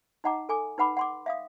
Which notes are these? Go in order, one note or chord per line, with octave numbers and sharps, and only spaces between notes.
D#4 D#5 F#5 A#5 D6
A4 G#5 D6
D#4 B4 F#5 B5 D6
F#5 C6 D6
E5 F5 D#6